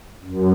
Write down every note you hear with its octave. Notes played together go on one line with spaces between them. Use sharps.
F#2